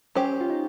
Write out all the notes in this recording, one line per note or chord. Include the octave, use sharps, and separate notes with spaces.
C#4 G4 C5
F4
D#4